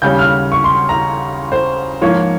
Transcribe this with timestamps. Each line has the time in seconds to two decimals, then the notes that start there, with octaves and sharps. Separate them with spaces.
0.02 D#2 C#3 G3 C#4 G6
0.19 F6
0.52 C#6
0.64 C6
0.89 A#5
1.52 C5
2.01 G#2 F3 A#3 C#5